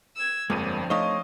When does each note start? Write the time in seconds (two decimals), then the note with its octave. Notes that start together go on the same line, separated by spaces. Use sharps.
0.16 E6 G#6
0.50 G1 F2 F3 G#3 A#3 C4 D4 D#7
0.90 A3 D#4 C5 C#5 D#5 F5 D#6